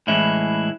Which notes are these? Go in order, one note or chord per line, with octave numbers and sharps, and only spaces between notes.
A2 E3 G#3 C#4 E4